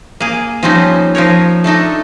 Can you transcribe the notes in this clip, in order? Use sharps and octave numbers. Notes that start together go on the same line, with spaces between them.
A#3 G#4
F3 G3 C4 C#4 D#4
F3 D#4 A#4 C#5
A3 D4 D#4 A4